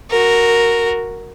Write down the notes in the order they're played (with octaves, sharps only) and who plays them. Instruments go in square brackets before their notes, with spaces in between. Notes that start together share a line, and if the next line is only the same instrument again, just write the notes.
[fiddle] F#4 A#4